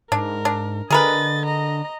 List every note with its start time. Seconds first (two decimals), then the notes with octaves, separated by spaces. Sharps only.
0.12 G#2 D4 A#4
0.45 D4
0.90 D3 G#4 A#4 B4 D#5 A6
1.46 D#5 A#5